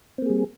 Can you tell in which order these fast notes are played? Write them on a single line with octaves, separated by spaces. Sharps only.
C4 A#3 G#4 G3